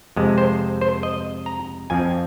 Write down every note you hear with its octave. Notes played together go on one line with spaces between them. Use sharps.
F2 C3 G#3
C5
C5
D#5
A#5
F2 F3 C4 G#5